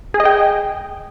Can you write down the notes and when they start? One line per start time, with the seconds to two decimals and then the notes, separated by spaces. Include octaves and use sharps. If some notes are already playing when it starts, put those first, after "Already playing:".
0.14 G#4
0.20 D#5
0.25 G5